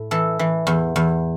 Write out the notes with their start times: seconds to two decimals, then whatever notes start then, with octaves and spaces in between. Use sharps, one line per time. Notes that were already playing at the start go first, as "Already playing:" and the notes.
Already playing: A2
0.11 E3 A4
0.39 E3
0.67 E2
0.96 E2